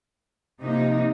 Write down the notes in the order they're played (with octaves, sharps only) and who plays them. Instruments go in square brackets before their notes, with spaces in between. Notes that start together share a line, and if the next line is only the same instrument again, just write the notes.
[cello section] C3 F3 A#3 D#4